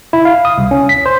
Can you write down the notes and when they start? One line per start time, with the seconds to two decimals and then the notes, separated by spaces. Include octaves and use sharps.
0.13 E4
0.25 F5
0.45 D#6
0.58 C2
0.71 C#4
0.89 B6
1.06 C5